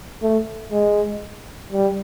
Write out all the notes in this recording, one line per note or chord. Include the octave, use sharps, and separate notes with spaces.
A3
G#3
G3